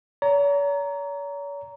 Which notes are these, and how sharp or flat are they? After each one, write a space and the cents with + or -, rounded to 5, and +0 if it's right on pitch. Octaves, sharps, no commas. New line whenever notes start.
C#5 +45 A#5 +0